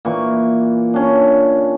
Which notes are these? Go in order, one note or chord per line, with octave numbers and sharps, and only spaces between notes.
A#2 E3 C#6
C#4 D4